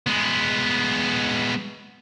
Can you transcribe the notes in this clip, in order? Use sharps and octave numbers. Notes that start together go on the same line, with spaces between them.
G#3 B3